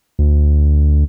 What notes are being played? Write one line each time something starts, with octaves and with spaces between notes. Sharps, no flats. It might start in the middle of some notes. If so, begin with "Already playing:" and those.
D2